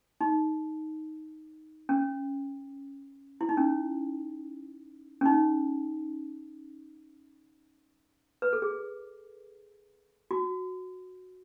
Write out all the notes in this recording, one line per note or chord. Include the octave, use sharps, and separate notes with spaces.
D#4
C#4
E4
D#4
C#4
C#4
D#4
B4
A4
G#4
F#4